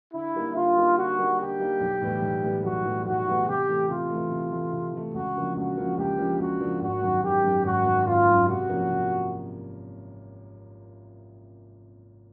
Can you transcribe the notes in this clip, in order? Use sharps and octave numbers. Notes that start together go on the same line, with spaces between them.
D3 E4
G3 A#3 D#4
D3 F4
G3 A#3 D#4
D3 F#4
G3 A#3 D#4
D3 G4
G3 A#3 D#4
B1
A2 E3 G3 B3
B1
A2 E3 G3 B3
B1 F#4
A2 E3 G3 B3
B1 F#4
A2 E3 G3 B3
C3 G4
E3 A3
C3 F4
E3 A3
C3
E3 A3
C3
E3 A3
C#2 F#4
C#3 F3 A#3 D4
C#2 F#4
C#3 F3 A#3 D4
C#2 G4
C#3 F3 A#3 D4
C#2 F#4
C#3 F3 A#3 D4
G#1 F#4
F#2 D#3
G#1 G4
F#2 D#3
G#1 F#4
F#2 D#3
G#1 F4
F#2 D#3
C3 F#4
F3 A#3 C#4 E4
C3